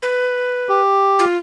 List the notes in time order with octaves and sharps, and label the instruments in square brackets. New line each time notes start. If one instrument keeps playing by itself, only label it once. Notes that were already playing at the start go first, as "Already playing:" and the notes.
[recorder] B4
[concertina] G4
[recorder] F4